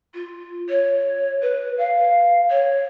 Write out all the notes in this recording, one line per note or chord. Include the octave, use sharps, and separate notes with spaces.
F4
C#5
B4
F5
C#5